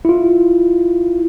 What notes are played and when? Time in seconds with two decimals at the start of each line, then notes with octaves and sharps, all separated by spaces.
0.05 E4 F4